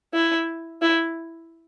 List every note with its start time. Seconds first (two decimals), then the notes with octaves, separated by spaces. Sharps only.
0.13 E4
0.82 E4